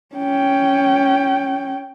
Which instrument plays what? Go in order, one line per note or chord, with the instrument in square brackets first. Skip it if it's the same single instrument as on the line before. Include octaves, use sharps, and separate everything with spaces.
[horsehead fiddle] C#4 G5